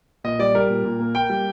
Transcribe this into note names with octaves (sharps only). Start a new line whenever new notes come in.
A#2 D#5
G3 D5
G3 A#4
A#2
A#2
A#3
A#3 G5
G3